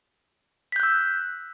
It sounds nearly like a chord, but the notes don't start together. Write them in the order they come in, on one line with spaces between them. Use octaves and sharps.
B6 G6 F#6 E6